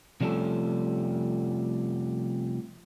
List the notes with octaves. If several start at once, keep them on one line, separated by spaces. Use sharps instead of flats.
C3 F3 G3 A3 C#4 A4